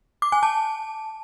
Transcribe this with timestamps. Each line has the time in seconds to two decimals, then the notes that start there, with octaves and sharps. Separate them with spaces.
0.22 D6
0.32 G#5
0.43 A5